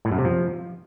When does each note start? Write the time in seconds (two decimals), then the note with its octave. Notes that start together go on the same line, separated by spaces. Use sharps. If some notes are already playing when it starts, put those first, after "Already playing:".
0.05 A2
0.12 F#2
0.18 C3
0.25 F3